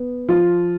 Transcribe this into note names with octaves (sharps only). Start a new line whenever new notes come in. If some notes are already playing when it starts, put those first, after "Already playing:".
Already playing: B3
F3 F4